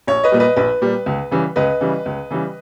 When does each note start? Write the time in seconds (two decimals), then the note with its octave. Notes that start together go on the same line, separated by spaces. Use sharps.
0.07 A#1 C#5
0.24 B4 D#5
0.32 A#2 G3
0.40 B4 D#5
0.56 A#1 B4
0.81 A#2 G3
1.06 C#2
1.31 C#3 E3 G3
1.56 C#2 B4 D#5
1.81 C#3 E3 G3
2.06 C#2
2.31 C#3 E3 G3